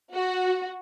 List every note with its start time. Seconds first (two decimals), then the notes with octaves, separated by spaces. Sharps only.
0.13 F#4